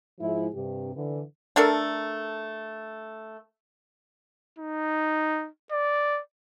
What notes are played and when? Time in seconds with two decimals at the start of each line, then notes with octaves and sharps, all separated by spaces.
0.21 G#2 F3 G#3 E4
0.54 G2 C3 G4
0.94 D3 E3
1.56 A3 D4 A4 A#4
4.59 D#4
5.72 D5